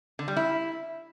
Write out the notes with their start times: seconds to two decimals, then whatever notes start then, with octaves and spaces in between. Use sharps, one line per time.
0.19 D3
0.28 G3
0.36 E4